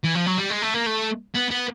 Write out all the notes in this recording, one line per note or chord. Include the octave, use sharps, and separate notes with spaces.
E3
F3
F#3
G3
G#3
A3
A#3
A3
B3
B3